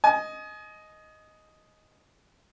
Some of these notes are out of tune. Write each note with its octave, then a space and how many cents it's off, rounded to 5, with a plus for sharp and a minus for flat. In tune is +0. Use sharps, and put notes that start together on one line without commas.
D#5 +0 G#5 +35